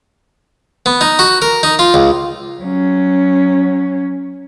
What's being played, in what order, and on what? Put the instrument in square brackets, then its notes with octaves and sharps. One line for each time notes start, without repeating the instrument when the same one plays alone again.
[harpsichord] B3
D#4
F#4
A#4
D#4
F4
C#2
[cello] F#3 C#4